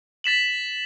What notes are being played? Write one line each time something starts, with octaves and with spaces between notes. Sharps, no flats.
A6 B6 E7 F#7